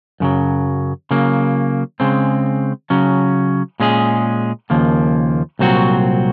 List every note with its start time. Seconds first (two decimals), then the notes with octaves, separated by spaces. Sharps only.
0.20 F#2 C#3 F#3
1.11 C#3 F#3 A#3
2.00 C#3 G#3 C4
2.90 C#3 F#3 C#4
3.80 A#2 G#3 C#4 G#4
4.70 D#2 C#3 F3 A#3
5.59 C2 A#2 F#3 C4 F#4